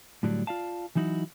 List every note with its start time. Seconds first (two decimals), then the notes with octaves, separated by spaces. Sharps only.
0.23 A2 D3 F#3 G3 D4
0.47 F4 D5 F5 A5
0.95 E3 F#3 D#4 E4 F#4